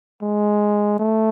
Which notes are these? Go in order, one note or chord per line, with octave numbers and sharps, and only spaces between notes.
G#3
A3